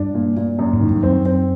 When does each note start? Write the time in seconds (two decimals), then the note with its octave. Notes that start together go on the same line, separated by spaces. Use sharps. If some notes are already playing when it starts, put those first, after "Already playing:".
Already playing: G2 D4
0.14 A#2
0.36 A#2
0.59 F#2
0.73 G#2
0.81 D#3
0.88 G2
1.03 F#2 C4
1.25 C4